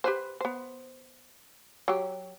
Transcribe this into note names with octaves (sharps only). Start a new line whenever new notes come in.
G4 B4 C5
B3 C5
F#3 G4